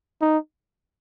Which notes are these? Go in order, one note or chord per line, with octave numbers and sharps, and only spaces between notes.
D#4